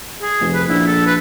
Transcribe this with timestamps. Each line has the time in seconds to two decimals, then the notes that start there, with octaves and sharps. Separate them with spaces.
0.22 G#4
0.41 F1
0.53 B4
0.69 A#1 E4
0.87 A4
1.06 B4